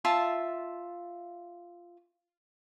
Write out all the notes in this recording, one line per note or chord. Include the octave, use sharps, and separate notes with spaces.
F4 E5 A5